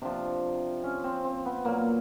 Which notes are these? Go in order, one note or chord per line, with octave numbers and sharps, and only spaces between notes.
C3 F3 D4
C#4
C4
C4
B3
A#2 F#3 A#3